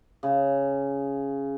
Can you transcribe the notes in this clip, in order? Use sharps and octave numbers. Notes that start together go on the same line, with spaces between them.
C#3